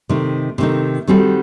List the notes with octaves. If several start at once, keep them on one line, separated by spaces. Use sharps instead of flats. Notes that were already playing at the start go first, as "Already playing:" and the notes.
C3 D#3 A3 D#4
C3 D#3 A3 D#4
D#3 G3 C4 F#4 A4